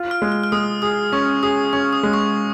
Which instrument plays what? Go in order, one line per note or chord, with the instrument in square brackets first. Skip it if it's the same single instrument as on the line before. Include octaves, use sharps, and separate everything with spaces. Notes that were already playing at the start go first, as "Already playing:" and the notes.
Already playing: [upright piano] F4
[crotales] F6
[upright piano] G#3
[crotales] F6
F6
[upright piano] G#3 [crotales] D#6
[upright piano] G#4 [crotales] D#6
[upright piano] C#4 [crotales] C#6
[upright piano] G#4 [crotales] D#6
[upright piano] C#4 [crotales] C#6
[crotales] D#6
[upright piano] G#3
[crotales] C#6